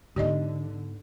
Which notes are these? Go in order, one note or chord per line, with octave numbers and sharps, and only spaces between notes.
G#2 D3 B3 G4 D5 D#5